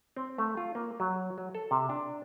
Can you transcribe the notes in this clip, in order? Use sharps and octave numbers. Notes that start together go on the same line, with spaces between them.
C4
A3
F4
A#3
F#3
F#3
A4
C3
D4